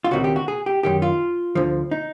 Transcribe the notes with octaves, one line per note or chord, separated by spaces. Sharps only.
F4
C#2 C3 D#3 F#4
G4
F#4
G#4
G4
F#2 D#3 G4
F4
D2 D3 F3
D#4